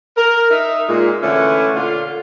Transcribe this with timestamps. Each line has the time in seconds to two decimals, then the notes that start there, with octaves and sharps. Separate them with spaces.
0.17 A#4
0.51 D#4 E5
0.88 A#2 G#3
1.22 D3 E3 A3 C#4 E4
1.75 A#2 D3 F4